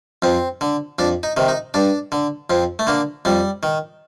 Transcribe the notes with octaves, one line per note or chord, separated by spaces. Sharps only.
F2 C4
D3
F2 D4
D#4
C3 D#3
D#4
G2 D4
D3
F2 C4
A3
D3 A#3
F2 G3
D#3